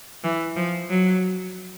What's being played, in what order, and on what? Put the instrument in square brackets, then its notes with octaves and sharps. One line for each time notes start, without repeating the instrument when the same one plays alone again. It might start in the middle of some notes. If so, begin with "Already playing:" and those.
[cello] E3
F3
F#3